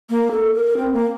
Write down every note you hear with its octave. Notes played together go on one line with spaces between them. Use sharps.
A#3
A4
A#4
C4
A#3